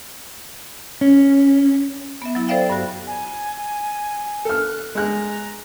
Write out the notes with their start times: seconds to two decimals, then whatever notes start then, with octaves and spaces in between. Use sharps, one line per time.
1.01 C#4
2.22 B3 E5
2.35 F#3 E4
2.48 A4 C5 D5 E5 F5 G5
2.70 G2 F#4
3.06 G#5
4.45 A4 F6
4.60 F#6
4.95 G#3 A#5 F#6